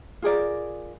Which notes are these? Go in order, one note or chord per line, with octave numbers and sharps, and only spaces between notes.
F4 G#4 A#4 D5